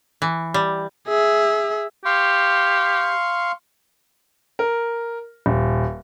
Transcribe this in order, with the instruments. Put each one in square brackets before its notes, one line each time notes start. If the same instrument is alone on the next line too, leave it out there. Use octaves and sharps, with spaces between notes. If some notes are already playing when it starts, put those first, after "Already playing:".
[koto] E3
G3
[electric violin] G#4 E5
[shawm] G4 [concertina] F5 C6 C#6
[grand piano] A#4
D#1